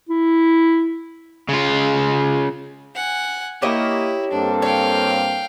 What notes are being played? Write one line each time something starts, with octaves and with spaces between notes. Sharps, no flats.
E4
C#3 F4
F#5 G#5
A#3 E4 G4 C#5 D#5
G2 A#3 C4 D4 A4
C#5 F5 G5